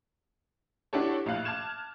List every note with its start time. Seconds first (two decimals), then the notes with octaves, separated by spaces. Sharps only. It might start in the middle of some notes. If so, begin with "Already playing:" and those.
0.93 D4 E4 F#4 G4 A4 C#5
1.26 A#1 A2 F5 F#6
1.45 A5 D6 F6 G#6 E7